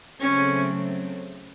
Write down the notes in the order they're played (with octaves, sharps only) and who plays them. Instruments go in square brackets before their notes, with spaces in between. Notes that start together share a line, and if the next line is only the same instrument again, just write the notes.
[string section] C#3 F#3 A3 C4 [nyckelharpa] C#4